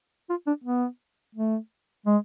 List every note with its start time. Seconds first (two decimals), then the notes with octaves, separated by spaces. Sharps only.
0.29 F4
0.47 D4
0.64 B3
1.35 A3
2.06 G#3